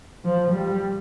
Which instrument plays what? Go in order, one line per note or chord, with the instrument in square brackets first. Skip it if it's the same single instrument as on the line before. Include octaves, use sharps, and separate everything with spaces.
[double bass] F3
G3